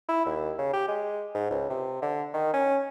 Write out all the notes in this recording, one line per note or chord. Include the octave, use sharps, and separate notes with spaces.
E4
D#2
C#3
G4
G#3
G#2
C#2
C3
D3
D#3
C#4